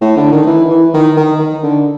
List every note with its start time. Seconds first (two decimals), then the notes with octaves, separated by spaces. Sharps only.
0.01 A2
0.17 D3
0.32 D#3
0.47 E3
0.70 E3
0.94 D#3
1.17 D#3
1.39 D#3
1.63 D3